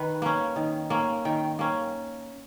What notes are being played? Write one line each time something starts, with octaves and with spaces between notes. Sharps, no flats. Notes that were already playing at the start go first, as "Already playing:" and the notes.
Already playing: D#3 B4
A#3 C#4
D#3
A#3 C#4
D#3 G5
A#3 C#4